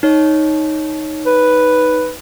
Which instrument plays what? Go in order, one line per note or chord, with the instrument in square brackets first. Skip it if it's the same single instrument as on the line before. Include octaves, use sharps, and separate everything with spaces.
[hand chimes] D#4 C#5
[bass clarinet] B4